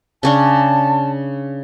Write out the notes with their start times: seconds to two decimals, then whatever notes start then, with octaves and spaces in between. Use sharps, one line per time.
0.23 C#3 C#4 D4 A5